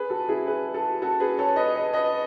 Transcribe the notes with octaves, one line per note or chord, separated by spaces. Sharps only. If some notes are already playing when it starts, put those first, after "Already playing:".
Already playing: G#4 B4
F#4 A4
E4 G#4
G#4 B4
F#4 A4
F#4 A4
G#4 B4
A4 C#5
B4 D#5
B4 D#5
B4 D#5